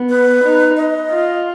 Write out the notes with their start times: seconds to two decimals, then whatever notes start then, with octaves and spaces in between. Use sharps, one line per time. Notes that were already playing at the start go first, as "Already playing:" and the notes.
Already playing: B3
0.09 B4
0.44 D#4
0.77 D#5
1.11 F4